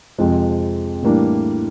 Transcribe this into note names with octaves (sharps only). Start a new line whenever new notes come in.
F2 C3 F3 G#3
A2 E3 G3 A#3 D4